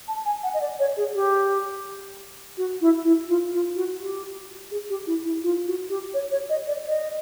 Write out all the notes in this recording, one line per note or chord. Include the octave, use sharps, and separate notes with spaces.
A5
G#5
F#5
D#5
D5
C#5
G#4
G4
F#4
E4
E4
F4
F4
F#4
G4
G#4
G4
E4
E4
F4
F#4
G4
C#5
C#5
D#5
D5
D#5